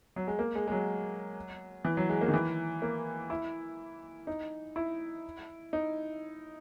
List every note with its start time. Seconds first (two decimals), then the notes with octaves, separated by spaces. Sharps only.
0.16 F#3
0.27 G#3
0.39 A#3
0.55 G#3
0.68 G#3
0.72 F#3
1.85 E3
1.97 F#3
2.09 G#3
2.21 A#3
2.28 D#3
2.34 E3
2.82 A#3
3.30 E4
4.27 D#4
4.76 E4
5.73 D#4